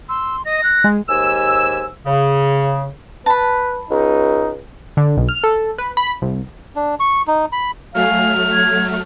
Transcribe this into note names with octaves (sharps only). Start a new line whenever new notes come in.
C6 E6
D#5 A#6
F#6
G#3
D#2 G#2 G4 G#5 E6
C#3
B4 A5 B5
C#2 D#4
D3
B1
F6
A4
B4
B5
C2
D4
C#6
D#4
B5
F#3 A3 F5 G#5 F6
G#6